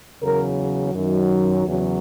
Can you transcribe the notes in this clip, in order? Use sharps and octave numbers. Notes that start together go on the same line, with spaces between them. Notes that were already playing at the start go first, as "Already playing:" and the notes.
E2 C#3 F#3 A#4
F#2 D#3 F#3
E2 C#3 F#3